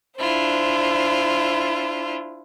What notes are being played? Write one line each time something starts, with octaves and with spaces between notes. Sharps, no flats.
D4 E4 F4 C5